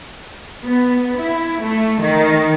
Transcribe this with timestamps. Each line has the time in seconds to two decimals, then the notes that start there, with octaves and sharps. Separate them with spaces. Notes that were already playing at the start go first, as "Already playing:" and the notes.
0.65 B3
1.18 E4
1.62 A3
2.02 D#3